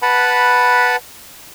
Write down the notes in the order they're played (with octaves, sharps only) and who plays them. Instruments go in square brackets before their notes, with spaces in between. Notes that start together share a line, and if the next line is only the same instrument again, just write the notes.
[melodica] B4 F#5 A5 B5